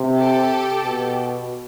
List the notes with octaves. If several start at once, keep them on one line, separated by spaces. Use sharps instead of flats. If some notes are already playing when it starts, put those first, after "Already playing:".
Already playing: C3
G4 A4
B2